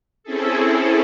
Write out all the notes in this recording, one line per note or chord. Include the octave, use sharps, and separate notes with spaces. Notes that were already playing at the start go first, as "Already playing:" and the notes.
C4 C#4 E4 G#4 A4